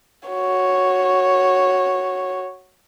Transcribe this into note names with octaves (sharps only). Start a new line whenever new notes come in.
F#4 C#5